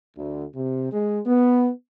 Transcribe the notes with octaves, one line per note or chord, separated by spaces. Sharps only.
D2
C3
G#3
B3